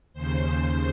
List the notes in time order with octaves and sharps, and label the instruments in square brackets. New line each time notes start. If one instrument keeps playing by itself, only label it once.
[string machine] D#2 C#3 C5